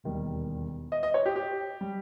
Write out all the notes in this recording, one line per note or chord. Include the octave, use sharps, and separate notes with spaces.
E1 D#2 D#3 G3
D#5
D#5
C#5
G4
G4
G3